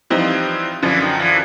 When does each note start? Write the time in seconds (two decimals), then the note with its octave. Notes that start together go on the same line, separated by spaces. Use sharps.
0.10 E3 F3 G3 C4 D#4
0.83 F#2 D3 E3 F3
1.00 D#3
1.20 E3